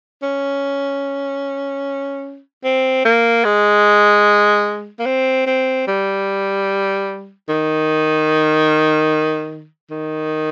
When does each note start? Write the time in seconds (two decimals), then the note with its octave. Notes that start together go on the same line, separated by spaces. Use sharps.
0.22 C#4
2.64 C4
3.05 A#3
3.44 G#3
4.99 A#3
5.06 C4
5.46 C4
5.87 G3
7.49 D#3
9.90 D#3